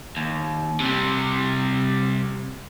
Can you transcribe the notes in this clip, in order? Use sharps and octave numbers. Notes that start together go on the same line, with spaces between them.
D#2
C3 G3